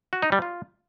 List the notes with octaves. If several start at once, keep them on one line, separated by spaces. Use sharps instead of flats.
F#4
D#4
G3
F4